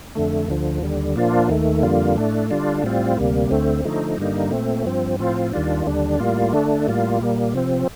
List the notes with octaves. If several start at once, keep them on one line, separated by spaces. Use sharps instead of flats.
F2 D3 A3
D2 D3 F3
D#2 D3 G3
A#2 F3 A#3 D4 F4
D#2 D#3 A3
F2 D3 G3 A#3 F4
A2 A3 D4
D3 G3 D4 F4
A2 G3 C4 F4
D2 C3 G3 A#3
D2 D3 A3 C4
D3 F3 A3 D#4
G2 D3 G3 A#3 D#4
A#2 A3 C4
G2 F3 C4
A2 F3 C4 F4
D#2 D#3 G3 D4 F4
D#2 D3 G3 D4
A2 G3 A#3 F4
D3 A3 D4
A2 G3 A#3 F4
A#2 G3 A#3
C3 F3 C4